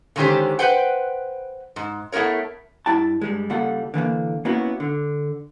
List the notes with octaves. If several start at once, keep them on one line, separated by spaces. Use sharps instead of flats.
D3 D#3 G#3 C#4 G4 C5
B4 C5 F#5 G5
G#2
A3 B3 E4 A#4 C#5
G2 E4 G5 A5
G2 G3 G#3
C#3 G3 A#3 F4 A4 F#5
D3 E3 G#3 A#3
A#3 B3 C#4 E4 F#4
D3